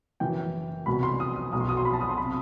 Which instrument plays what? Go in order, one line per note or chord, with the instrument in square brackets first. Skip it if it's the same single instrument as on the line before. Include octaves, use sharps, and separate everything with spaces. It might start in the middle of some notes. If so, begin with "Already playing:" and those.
[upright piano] F#1 F#2 E3 G5
C2 B2 F#3 B5
C6
D#6
D#6
B1 B2 F#3 D#6
C6
D#6
C6
B5
A5
D#6
C6
C3 B5